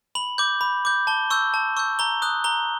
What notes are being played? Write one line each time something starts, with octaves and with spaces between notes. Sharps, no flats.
B5 F#7
D6 G6
B5
D6 G6
A5 G7
C#6 E6 G6
A5
C#6 E6 G6
A#5 G7
D#6 F#6
A#5 G7